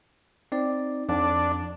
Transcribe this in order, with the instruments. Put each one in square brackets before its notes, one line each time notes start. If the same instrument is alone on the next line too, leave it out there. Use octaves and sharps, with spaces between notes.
[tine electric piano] C4 D#4 D5
[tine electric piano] F2 [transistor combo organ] D4